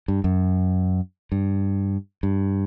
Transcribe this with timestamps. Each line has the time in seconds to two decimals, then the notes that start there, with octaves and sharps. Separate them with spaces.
0.08 G2
0.24 F#2
1.32 G2
2.23 G2